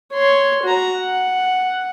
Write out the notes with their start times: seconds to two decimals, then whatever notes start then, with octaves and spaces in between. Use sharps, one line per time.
0.14 C#5 C6
0.64 F#4 A#5
0.98 F#5